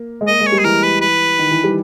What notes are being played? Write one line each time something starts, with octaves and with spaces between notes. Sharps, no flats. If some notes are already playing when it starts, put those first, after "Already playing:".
Already playing: A#3
G#3
A#3 D#5
G#3
C#5
G3
G#4
E3 A#4
B4
B4
D#3
E3
G3